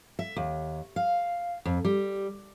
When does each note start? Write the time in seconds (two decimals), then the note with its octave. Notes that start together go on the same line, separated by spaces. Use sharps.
0.19 E5
0.36 D#2
0.96 F5
1.65 F2
1.85 G3